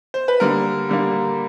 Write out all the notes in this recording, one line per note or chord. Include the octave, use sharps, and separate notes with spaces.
C5
B4
D3 G3 A#3 A#4
D3 G3 A#3